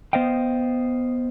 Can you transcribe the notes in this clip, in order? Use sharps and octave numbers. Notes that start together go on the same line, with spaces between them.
B3 C5 D#5 F5 G5